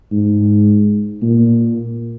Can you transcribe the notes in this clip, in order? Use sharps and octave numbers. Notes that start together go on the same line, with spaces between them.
G#2
A#2